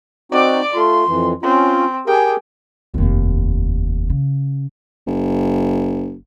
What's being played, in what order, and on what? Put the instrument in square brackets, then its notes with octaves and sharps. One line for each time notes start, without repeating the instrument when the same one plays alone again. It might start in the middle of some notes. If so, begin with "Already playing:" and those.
[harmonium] C4 D#4 F#4 [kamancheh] D5 D6
[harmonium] A3 F4 [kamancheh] C6
[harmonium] F2 E3
[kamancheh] C4 [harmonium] C#4 F4
[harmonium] G4 G#4 A#4 [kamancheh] G5 G#5
[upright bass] F1 D#2
C#3
[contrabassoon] F#1